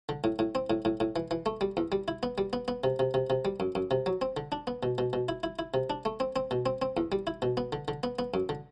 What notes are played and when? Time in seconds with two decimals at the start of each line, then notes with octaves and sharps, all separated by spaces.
0.09 D3
0.24 A2
0.39 A2
0.55 C4
0.70 A2
0.85 A2
1.00 A2
1.16 E3
1.31 E3
1.46 A3
1.61 G3
1.77 E2
1.92 G3
2.08 E4
2.23 B3
2.38 G3
2.53 B3
2.68 B3
2.84 C3
2.99 C3
3.14 C3
3.30 C3
3.45 G3
3.60 F#2
3.75 F#2
3.91 C3
4.06 F#3
4.22 C4
4.37 D3
4.52 D4
4.67 B3
4.83 B2
4.98 B2
5.13 B2
5.29 E4
5.43 E4
5.59 E4
5.74 C3
5.90 D4
6.05 A3
6.20 C4
6.36 C4
6.51 B2
6.66 C4
6.82 C4
6.97 E2
7.12 G3
7.27 E4
7.42 B2
7.57 B3
7.73 D3
7.88 D3
8.03 B3
8.19 B3
8.34 F#2
8.49 D3